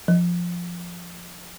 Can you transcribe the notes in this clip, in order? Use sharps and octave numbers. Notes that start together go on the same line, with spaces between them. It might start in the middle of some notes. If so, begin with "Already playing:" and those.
F3